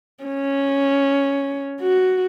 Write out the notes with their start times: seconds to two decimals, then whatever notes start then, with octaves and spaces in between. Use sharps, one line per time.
0.24 C#4
1.81 F#4